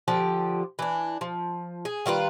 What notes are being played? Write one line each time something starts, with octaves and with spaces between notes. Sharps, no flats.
D3 F3 G4
E3 D4
F3
G#4
D#3 G3 F4 B4